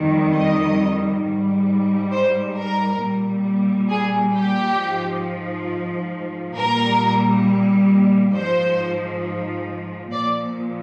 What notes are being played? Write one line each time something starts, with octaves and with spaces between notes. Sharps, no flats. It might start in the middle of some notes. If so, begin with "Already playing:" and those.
Already playing: F2 D#3 G3
D#5
G#2 G3
C5
A#4
A#2 G3
G#4
G4
F3
G#2
A#2 G3 A#4
G#2 F3 C5
A#2 F3 D5